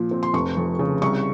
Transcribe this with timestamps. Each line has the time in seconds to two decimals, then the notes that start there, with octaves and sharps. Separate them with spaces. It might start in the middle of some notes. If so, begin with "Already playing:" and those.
Already playing: A#2 F3
0.11 C4
0.23 C6
0.34 F1 C#6
0.57 F2
0.79 C#3
1.02 C2 C#6